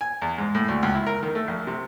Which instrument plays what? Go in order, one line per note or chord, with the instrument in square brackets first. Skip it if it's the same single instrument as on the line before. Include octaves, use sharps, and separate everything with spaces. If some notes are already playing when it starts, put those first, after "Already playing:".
[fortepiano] G#5
E2
G#2
A2
D2
C#2
E4
A#4
D#3
A3
A#1
C3